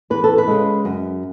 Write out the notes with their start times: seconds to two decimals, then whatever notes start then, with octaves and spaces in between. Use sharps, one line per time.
0.10 E2 B4
0.24 A4
0.38 B4
0.47 C#3 G#3
0.85 F#2